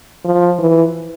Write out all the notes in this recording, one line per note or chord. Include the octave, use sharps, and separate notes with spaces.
F3
E3